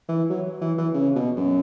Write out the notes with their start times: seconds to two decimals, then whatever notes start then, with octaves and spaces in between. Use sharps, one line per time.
0.08 E3
0.30 F#3
0.61 E3
0.78 E3
0.94 C#3
1.16 B2
1.37 F#2